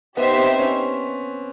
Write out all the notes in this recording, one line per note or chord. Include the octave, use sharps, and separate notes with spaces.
B3 D#4 G4 C5 E5
C4
C#4